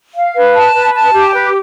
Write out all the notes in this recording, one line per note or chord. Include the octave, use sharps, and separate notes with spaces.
F5
B4
A5
B4
A5
G4
B4